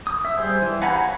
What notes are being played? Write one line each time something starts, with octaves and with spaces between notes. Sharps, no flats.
D#6
E5
G3 G#4 C5
E3
F5 F#5 G#5 A#5 B5
C#5